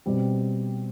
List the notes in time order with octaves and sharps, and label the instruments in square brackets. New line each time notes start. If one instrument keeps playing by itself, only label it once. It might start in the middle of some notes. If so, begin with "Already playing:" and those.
[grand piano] B2 G3 C4